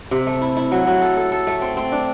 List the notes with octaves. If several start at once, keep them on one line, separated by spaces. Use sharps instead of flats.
C3
A3
E4
E4
F#3
F#3
A4
A4
A4
A3
C4
C4
D4